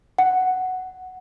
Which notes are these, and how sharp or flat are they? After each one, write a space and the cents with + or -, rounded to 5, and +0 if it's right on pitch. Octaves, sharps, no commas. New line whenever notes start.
F#5 +5